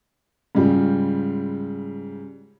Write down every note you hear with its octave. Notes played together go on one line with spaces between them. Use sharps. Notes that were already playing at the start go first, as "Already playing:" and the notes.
G#2 C#3 G3 F4